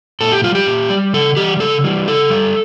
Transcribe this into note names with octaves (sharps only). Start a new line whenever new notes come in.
A#2 A4
G4
G3 F4
G4
A#2
G3
C#3 A4
E3 G3 G4
C#3 A4
E3 G3
C#3 A4
G3